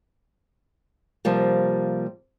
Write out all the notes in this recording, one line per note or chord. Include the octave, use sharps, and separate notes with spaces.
C3 F3 G3 A#3